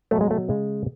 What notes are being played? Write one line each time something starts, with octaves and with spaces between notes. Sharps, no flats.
B2 F#3 A3
G#3
A3
C#3 G#3